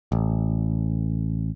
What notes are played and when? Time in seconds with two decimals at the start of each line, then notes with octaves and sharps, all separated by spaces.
0.12 A1